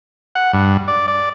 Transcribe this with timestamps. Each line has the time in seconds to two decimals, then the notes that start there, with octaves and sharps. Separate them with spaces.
0.35 F#5
0.53 G2
0.88 D5
1.08 D5